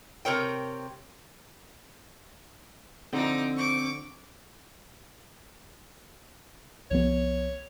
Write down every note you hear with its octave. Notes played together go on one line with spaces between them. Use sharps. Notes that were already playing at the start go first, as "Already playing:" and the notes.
C3 A#4 C#5 G5
D3 F3 C4 D#4 D6
C#6 D6
C2 F3 B3 C#5